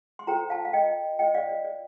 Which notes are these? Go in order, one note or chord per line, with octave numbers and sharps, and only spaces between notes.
C6
F4 A4 C5 G5 A#5
F5 A5
F5
D#5 G5
F4 C5 D#5 G5
D5 F5
D5
D5